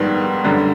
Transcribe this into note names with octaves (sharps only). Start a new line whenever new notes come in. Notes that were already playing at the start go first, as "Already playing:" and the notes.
Already playing: A#1 G#2 D#3 G3 B3
F#2 D3 G3